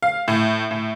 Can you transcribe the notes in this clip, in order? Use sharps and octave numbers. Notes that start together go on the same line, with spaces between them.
F5
A2
A2